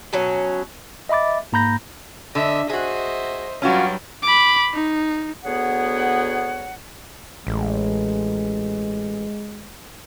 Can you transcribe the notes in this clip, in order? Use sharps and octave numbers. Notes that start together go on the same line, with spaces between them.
B2 F#3 C#4
D#5 E5 B5 D6 A6
G#2 A#3 A#5 B5 G6 A#6
D3 D#5 E5
F#4 G#4 C5 D#5 E5
G2 F#3 G3 C#4 F4 F#4
B5 D6
D#4
D2 B3 G#4 C#5 F#5
A1 G#3